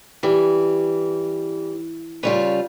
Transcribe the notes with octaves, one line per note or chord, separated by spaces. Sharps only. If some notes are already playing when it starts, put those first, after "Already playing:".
E3 G3
C#3 G3 F4 B4 C#5